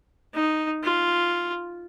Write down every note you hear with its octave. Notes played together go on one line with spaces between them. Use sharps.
D#4
F4